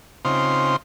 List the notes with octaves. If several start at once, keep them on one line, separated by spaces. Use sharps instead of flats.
C#3 C4 D#4 F4 C5